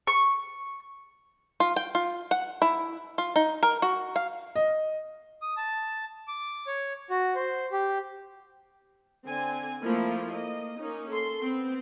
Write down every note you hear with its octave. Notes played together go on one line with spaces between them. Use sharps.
C#6
F4
G5
F4
F#5
E4
F4
D#4
A#4
F#4
F5
D#5
D#6
A5
D6
C#5
F#4
C5
G4
D3 C4 G#5
F3 A3 A#3 E4 F4
A#3 D#5
A#3 C#4 D#4
A4 C6
B3 C4